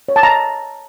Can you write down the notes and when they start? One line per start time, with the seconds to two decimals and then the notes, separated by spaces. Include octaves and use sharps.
0.09 C#5
0.16 A5
0.23 A#5